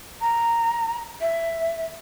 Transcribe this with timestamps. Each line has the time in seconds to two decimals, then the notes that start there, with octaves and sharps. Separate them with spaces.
0.21 A#5
1.21 E5